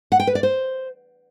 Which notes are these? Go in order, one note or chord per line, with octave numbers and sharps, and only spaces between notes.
F#5
G5
B4
D5
C5